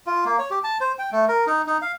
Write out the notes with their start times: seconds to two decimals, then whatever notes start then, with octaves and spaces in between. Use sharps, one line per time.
0.07 F4
0.25 A#3
0.39 C#5
0.51 G4
0.64 A5
0.81 C5
0.99 G5
1.12 A3
1.28 A#4
1.47 D#4
1.67 D#4
1.82 F5